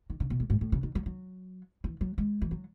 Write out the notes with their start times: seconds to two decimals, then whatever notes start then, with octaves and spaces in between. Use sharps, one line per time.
0.10 D#3
0.20 C#3
0.30 B2
0.40 A2
0.50 G#2
0.61 A2
0.72 C#3
0.83 D#3
0.95 F#3
1.06 F#3
1.84 E3
2.01 F#3
2.18 G#3
2.42 E3
2.51 F#3